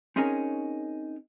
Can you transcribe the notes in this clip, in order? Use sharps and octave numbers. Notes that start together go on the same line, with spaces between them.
C4 C#4 D#4 G#4 A#4 C#5